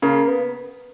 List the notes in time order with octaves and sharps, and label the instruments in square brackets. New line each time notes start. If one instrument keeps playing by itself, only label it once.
[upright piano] C#3 [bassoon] A#3
[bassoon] B3